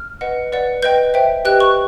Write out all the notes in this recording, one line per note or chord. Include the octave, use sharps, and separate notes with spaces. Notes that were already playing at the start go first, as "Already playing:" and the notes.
Already playing: F6
B4 D#5 F#5
B4 D5 F#5
B4 D#5 G5 G6
C5 E5 G5
G4 B4 D#5 G5 F#6
C#6